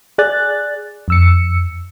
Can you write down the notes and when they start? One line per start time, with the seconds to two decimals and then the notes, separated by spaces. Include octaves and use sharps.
0.18 G#4 D5 F#6 A6
1.08 F2 E6 C#7